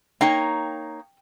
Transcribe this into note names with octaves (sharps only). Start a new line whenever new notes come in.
A#3 D#4 C#5 G5